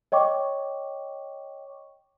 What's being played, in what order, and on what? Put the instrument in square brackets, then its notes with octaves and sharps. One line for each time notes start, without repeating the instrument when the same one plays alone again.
[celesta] C#5 D#5 G5 C#6 D6